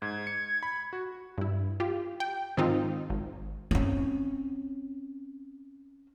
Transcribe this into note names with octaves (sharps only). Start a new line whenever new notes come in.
G#2 G#6
C#7
B5
F#4
G2 E4
F4 G4
G5
G#2 D#3 F3 C4 D#4 F4
G#1
C4 C#4